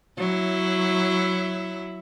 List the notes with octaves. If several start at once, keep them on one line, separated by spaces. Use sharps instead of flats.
F#3 E4